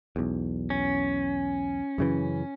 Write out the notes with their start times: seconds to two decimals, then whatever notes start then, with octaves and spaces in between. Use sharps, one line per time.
0.16 B1 E2
0.70 C#4
1.98 F#2 C#3 E3